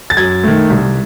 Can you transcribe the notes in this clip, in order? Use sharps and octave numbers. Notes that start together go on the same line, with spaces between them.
A6
F#2 G#6
D#3 A3
C2